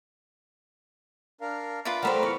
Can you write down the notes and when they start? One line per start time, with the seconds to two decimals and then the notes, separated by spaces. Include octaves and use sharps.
1.41 D4 A#4 F5
1.85 F4 B4 D5 E5
2.03 G3 A3 A#4 C5 F#5 A#5 B5 F6
2.23 E2 C#6 C#7